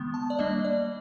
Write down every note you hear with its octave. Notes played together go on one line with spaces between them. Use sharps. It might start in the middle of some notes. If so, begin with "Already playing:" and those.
Already playing: D#3 G#3 B3
A5
D5
G3 A#3 D4 D#5
D5